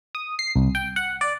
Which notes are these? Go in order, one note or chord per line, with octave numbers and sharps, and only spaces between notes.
D#6
C7
C2
G5
F#5
D5